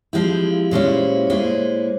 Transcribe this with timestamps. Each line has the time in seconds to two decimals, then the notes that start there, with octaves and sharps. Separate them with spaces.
0.13 F3 G#3 C4 E4 G4
0.31 G4
0.51 F5
0.71 A#2 G#3 C#4 E4 F5
0.85 E5
0.93 C5
1.00 C#5
1.15 E5
1.27 A#2 G#3 E4 C#5
1.38 C5
1.50 C#5